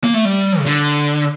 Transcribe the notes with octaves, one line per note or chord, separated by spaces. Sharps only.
A#3
A3
G3
C#3
D3